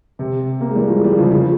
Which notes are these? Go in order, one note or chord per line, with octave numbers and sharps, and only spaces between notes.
C3
A#3
G#3
E3 G3
F3 G#3
E3 G3
C#3 F3
C#3 F3